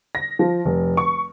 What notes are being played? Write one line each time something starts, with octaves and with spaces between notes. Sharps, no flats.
A#6
F3
F1
C#6